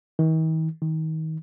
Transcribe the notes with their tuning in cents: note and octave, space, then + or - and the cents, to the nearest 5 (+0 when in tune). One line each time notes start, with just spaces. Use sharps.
D#3 +45
D#3 +30